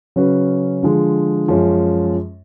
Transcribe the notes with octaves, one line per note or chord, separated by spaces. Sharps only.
C#3 F#3 C#4 F#4 B4
D3 F3 G#3
F#2 F3 G#3 C#4